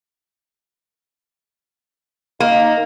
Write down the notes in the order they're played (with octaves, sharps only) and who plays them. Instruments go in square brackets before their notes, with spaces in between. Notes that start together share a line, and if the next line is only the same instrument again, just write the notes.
[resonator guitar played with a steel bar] A#3 [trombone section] D#4